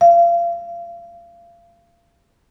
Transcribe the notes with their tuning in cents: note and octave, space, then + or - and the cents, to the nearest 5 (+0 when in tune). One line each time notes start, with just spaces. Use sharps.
F5 -30